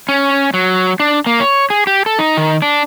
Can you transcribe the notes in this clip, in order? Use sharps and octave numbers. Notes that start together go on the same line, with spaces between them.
C#4
F#3
D4
A#3
C#5
G#4
G4
A4
D#4
D#3
D4